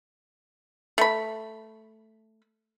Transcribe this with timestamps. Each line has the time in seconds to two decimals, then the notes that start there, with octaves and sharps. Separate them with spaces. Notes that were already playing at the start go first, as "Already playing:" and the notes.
0.98 A3 B5